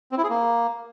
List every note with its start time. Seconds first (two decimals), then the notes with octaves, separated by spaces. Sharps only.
0.12 C4
0.18 E4
0.24 G#4
0.30 A#3